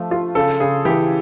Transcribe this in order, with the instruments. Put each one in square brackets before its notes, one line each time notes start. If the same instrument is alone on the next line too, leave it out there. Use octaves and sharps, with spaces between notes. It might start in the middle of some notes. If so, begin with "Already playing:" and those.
Already playing: [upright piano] F3 A3
F4
[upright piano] C#3 [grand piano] A4
[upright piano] C#3 [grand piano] G#4
[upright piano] E3 [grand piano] G4